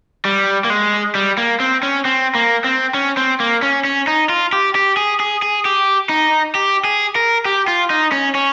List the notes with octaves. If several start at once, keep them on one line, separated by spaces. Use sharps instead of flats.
G3
A#3
G#3
G3
A#3
C4
C#4
C4
A#3
C4
C#4
C4
A#3
C#4
C#4
D#4
F4
G4
G4
G#4
G#4
G#4
G4
D#4
G4
G#4
A#4
G4
F4
D#4
C#4
C#4